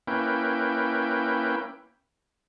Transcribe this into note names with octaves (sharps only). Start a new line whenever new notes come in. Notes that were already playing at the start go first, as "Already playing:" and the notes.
A#3 C#4 E4 B4 G5